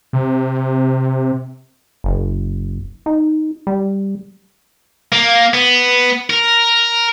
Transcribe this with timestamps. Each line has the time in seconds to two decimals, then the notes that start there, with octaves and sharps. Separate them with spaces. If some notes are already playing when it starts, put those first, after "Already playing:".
0.13 C3
2.04 F#1
3.06 D#4
3.67 G3
5.12 A#3
5.54 B3
6.30 A#4